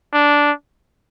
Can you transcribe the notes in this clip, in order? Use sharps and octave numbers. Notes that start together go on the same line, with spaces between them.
D4